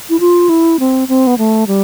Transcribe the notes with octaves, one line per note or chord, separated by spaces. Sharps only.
E4
F4
E4
C4
C4
B3
A3
G3